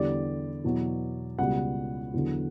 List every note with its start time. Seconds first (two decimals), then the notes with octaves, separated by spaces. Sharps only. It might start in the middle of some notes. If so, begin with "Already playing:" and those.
Already playing: E2 D3 G3 D5
0.64 E2 B2 F#3
1.38 C#2 B2 G3 F#5
2.14 E2 D3 F#3